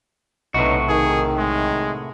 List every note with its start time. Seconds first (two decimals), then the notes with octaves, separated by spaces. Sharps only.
0.54 B1 A2 C3 B3 C#4 D#4 F#4
0.89 D#3 G#4
1.38 G#3